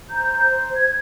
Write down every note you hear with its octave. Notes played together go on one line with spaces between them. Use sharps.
C5 A#5 G6
C5
G#6